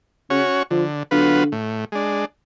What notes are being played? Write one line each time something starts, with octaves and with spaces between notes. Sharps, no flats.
C#3 C#4 F#4 C#5
D3 F3
D3 F#3 B3 F4 B4
A2
G#3 D4